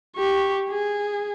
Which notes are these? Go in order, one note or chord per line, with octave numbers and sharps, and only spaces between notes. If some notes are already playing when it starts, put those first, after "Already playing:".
G4 C#6
G#4